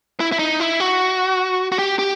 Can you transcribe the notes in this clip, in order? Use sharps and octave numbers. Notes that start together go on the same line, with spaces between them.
E4
E4
D#4
E4
F#4
F#4
G4
G4